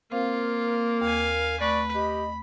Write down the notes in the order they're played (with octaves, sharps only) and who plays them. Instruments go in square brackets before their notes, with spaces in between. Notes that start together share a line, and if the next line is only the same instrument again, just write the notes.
[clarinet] A#3 [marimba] C4 C5 F5 [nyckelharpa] F4 [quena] A#4
[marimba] D#2 [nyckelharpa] F5 G#5
[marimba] A3 [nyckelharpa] B4 [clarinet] D5 [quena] C#6
[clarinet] G4 [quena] D#5 [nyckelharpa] B5